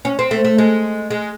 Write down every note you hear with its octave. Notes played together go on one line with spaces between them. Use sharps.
C#4
C4
A3
A3
G#3
G#3